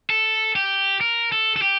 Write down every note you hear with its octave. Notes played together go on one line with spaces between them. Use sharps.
A4
G4
A#4
A4
A4
G4